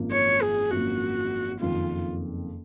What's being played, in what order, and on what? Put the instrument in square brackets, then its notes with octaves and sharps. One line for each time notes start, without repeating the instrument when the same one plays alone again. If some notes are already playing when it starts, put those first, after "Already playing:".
Already playing: [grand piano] G#1 F#2 F3 A#3
[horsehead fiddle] C#5
G#4
[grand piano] G#1 F#2 F3 A#3 [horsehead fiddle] F#4
[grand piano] F#1 F2 D#3 [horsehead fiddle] F4